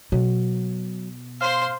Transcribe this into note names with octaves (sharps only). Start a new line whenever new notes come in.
B2 F#3
C5 F5 C6